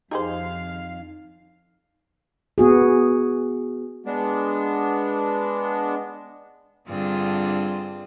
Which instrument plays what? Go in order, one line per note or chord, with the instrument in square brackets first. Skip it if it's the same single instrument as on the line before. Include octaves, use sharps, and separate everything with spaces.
[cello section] F2 F5 [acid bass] D#4 [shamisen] G4 G#4 C5
[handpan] B3 F#4 G#4
[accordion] G#3 B3 D4
[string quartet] G2 D3 C4 F4 G#4 D5